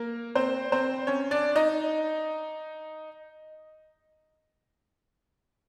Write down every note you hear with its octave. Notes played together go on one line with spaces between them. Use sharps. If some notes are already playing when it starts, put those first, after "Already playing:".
Already playing: A#3 A#4
C4 C5
C4 C5
C#4 C#5
D4 D5
D#4 D#5